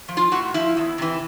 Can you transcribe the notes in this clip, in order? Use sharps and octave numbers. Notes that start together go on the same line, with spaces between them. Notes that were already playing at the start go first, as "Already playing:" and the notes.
F3
F4
A2 F#4
F3 E4
E2
C3 E3